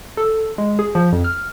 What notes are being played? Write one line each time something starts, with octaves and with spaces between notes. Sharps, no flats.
A4
G#3
G#4
F3
F2
F6